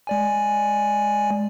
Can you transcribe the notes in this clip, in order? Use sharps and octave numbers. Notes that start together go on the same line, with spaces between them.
G#3 D5 G#5